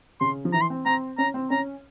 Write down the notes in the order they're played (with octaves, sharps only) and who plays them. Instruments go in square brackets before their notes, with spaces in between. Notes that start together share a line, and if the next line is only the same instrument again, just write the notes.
[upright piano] C#3 [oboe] C6
[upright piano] F3
[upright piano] E3 [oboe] A#5
[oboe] C6
[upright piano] C4
[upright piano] C4 [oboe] A#5
[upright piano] C#4 [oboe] A#5
[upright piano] C4
[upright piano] C#4 [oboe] A#5